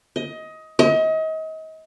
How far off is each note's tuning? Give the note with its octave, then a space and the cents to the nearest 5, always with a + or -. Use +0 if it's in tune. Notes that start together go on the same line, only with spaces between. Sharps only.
D#5 +20
D#5 +35